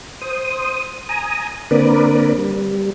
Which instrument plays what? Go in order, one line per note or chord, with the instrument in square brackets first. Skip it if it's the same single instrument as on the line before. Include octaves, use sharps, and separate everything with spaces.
[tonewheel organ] C5 D#6
G#5 A#5 D#6
D3 A#3 C4 A#4 B4 D5
G3